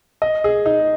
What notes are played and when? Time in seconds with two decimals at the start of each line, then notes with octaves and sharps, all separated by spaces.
0.22 D#5
0.44 G#4
0.66 D#4